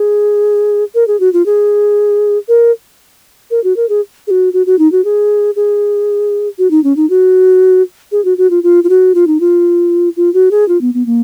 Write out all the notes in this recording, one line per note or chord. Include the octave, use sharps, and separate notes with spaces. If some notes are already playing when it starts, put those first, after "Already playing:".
Already playing: G#4
A#4
G#4
F#4
F4
G#4
A#4
A#4
F#4
A#4
G#4
G#4
F#4
F#4
F#4
D#4
F#4
G#4
G#4
F#4
D#4
C#4
D#4
F#4
G#4
F#4
F#4
F4
F4
F4
F#4
F4
D#4
F4
F4
F#4
G#4
F4
B3
B3
A#3